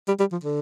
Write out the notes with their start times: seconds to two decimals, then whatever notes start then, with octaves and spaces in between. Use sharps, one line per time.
0.08 G3
0.20 G3
0.32 F3
0.44 D3